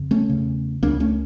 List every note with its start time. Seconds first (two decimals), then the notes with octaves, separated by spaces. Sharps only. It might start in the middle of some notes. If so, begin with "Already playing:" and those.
Already playing: F2 C#3
0.11 A3 C#4
0.29 E2 C#3
0.83 C#2 C#3 A#3 D4
1.00 A3 C#4